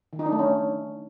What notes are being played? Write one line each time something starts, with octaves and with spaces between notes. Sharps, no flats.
D#3
D#4
D4
A3
C#4